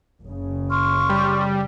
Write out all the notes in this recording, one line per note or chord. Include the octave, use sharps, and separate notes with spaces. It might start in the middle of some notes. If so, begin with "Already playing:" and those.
F#1 C#3
C6 C#6 F6
G3